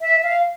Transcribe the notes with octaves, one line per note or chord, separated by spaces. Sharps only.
E5
F5